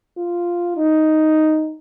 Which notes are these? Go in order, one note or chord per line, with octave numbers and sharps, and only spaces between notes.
F4
D#4